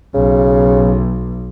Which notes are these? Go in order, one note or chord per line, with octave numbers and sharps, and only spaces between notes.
B1 C#3